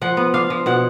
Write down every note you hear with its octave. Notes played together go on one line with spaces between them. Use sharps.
F3 F#5
B3
D4 F5
F3
B2 F#5